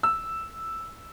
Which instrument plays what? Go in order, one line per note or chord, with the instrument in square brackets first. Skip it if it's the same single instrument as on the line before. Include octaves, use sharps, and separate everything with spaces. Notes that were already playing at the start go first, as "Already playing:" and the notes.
[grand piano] E6